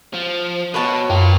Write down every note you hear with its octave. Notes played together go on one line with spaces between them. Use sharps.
F3
B2 B4 C#5 A5
F#2 A#3 F4